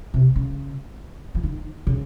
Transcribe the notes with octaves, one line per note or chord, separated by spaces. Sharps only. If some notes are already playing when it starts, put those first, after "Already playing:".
C3
C#3
F3
D#3
C#3